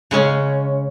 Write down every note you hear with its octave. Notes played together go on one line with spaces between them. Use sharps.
C#3 G#3 C#4